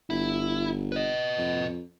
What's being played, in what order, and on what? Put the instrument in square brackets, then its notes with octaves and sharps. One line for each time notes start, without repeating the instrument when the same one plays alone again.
[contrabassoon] G1 [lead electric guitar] E4
[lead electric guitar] B4 D#5
[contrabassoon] F2